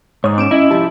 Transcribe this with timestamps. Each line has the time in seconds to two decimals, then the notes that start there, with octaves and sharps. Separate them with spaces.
0.24 G#2 C#5 D#6
0.38 C4 C#4 D6 D7 E7
0.51 C#4 E4 D#5
0.71 C2 F3 G4 A5